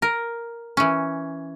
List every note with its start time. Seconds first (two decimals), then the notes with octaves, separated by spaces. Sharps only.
0.02 A#4
0.77 E3 C#4